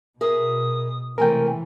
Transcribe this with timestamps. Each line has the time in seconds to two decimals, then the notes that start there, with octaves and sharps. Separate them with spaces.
0.21 B2 G#4 A#4 E5 D#6
1.18 C3 E3 G#3 A3 A#4 G5 G#5